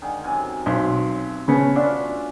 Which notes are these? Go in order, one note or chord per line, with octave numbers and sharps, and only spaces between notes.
D3 D#3 G#3
F#2 C3 G#5
B1 E5 C6
C#3 A3 B3 C#4
D4 F4 F#4 E5